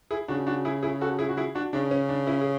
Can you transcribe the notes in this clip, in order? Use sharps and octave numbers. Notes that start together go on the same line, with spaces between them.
E4 G#4
C#3 D4 F#4
D4 F#4
E4 G#4
E4 G#4
F#4 A4
E4 G#4
F#4
E4 G#4
D4 F#4
C#3 D4
C#4
D4
C#4 E4
G#4